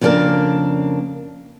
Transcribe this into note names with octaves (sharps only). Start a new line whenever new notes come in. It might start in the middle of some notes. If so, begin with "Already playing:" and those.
F2 C#3 A#3 D4 A#4 A5